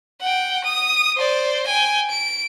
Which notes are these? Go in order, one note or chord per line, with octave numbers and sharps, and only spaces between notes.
F#5 G5
D#6
C5 D5
G5 G#5
D7